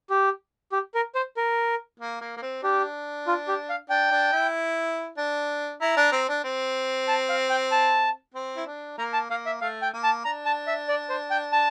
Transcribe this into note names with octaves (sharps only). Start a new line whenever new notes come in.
G4
G4
A#4
C5
A#4
A#3
A#3
A#3
C4
D4 G4
F4
G4
F5
D4 G5
D4
E4
D4
E4 A#5
D4
C4
D4
C4
A5
F5
G5
A5
C4
E4
D4
A#3 A#5
A5
A#3 F5
E5
A3 F5
G5
A#3
A5
D4 A#5
A5
E5
D5
C5
G5
A5